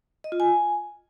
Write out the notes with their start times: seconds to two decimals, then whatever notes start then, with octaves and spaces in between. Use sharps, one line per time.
0.24 D#5
0.32 F4
0.40 G#5